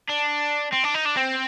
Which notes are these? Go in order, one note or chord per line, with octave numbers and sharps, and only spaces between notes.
D4
C4
D4
D#4
D4
C4